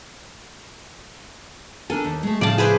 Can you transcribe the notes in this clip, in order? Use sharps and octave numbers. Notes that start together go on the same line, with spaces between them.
D4 A4 A#4 G#5
D#2
G#3 A3
A2 C#3 F3 D5 A5
G#4 B4 C5